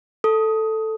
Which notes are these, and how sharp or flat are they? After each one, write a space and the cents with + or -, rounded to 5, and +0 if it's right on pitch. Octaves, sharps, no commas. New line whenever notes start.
A4 +0 D#6 +10